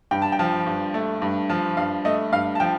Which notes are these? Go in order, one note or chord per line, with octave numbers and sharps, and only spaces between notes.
G2 G5
A5
G5
F3
G2
A3
G2
F3
G2 F5
A3 D#5
G2 F5
A5
F3 G5